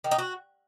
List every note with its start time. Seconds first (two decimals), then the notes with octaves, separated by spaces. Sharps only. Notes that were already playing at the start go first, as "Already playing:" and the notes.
0.04 D#3
0.11 D#4
0.18 F#4